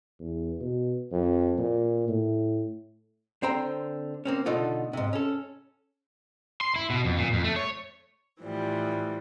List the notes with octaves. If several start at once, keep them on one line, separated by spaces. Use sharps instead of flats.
E2
B2
F2
A#2
A2
D3 C4 C5 G5 A#5
A#3 C4 C#4
B2 D3 A3 D#4 F4
G#2 C3
C#4 A4
C6
E4
B2
F2
A#2
F2
A3
C#5
A2 E3 F3 G3